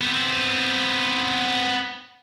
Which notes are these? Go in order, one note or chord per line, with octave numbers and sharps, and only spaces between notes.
B3 C4